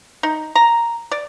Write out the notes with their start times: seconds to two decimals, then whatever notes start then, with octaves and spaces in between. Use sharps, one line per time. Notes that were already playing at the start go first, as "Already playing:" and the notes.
0.23 D#4
0.55 A#5
1.11 D5